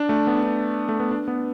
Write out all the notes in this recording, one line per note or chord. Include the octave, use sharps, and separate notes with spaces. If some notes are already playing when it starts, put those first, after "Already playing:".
Already playing: D4
A3
B3
D4
A3
B3
D4
B3